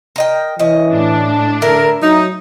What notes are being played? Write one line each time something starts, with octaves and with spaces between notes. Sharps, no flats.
A#4 D#5 G5
E3 C#4 D#5
A2 D4
D3 E4 A#4
F#3 D#4